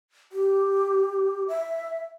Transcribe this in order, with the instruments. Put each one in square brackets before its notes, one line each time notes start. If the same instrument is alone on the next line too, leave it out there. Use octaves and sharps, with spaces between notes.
[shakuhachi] G4
E5